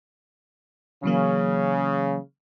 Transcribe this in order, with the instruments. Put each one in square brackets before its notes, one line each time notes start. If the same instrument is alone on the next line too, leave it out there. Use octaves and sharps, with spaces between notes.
[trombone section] C#3 [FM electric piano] E3 F#3 A#3